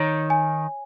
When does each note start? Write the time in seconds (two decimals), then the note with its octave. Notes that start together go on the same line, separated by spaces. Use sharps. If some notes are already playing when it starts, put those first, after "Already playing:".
Already playing: D#3 D#4 C#5
0.30 G#5